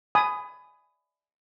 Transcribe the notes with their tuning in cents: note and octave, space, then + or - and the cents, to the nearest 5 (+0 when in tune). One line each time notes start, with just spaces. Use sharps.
G#5 +15 B5 +20 D#6 -5